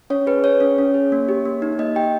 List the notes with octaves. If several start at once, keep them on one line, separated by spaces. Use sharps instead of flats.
C#4 C#5
G#4 B4
G#4 C#5
C#4
C#4
G#4
A#3
G4
A#3
D#4
A#3 D#5
G4 G5